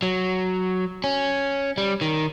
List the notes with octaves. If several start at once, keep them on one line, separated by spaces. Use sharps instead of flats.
F#3
C#4
G3
D#3